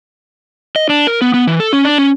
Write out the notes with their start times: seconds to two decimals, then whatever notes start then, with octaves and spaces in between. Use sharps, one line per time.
0.76 D#5
0.90 D4
1.07 A#4
1.21 B3
1.34 B3
1.47 E3
1.60 A4
1.73 C#4
1.85 D4
1.98 C#4